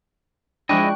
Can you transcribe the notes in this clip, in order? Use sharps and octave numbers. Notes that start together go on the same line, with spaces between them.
F3 G#3 D4 E4 D#5 G5 C#6 F#6